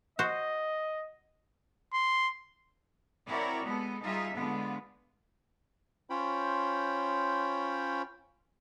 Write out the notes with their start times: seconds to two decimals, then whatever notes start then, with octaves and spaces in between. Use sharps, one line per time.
0.19 F#4 C5 D#5
1.93 C6
3.27 C4 E4 F#4 A#4 C#5 D5
3.63 G#3 B3 A4
4.03 G3 D#4 F4 G#4 E5
4.34 D3 G#3 B3 F4
6.10 C#4 F4 C5 C#5 G5 B5